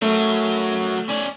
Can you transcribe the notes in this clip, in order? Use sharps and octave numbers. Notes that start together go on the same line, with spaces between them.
F#3 A3 A#4
C#4 D5